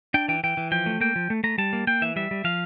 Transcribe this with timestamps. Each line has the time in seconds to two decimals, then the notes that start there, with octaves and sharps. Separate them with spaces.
0.14 D4 G5
0.28 E3 G5
0.44 E3 G5
0.57 E3
0.72 F3 G5
0.86 A3
1.01 A#3 G5
1.16 F3
1.30 A3
1.44 A3 A#5
1.58 G3 A5
1.73 A#3
1.87 A#3 G5
2.02 E3 E5
2.16 G3 E5
2.31 G3
2.44 F3 F5